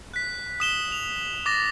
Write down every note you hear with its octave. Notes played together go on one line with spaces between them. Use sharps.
F#6 B6
D#6 E7 G7
F7
D6 A6 A#6 E7